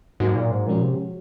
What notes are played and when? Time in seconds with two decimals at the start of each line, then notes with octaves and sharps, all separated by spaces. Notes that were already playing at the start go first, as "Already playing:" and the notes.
0.20 G#2 F#3 A#3 D#4 F#4
0.35 A#2
0.51 G#2
0.66 A#2 F3 G#3 C#4 F#4
0.81 C3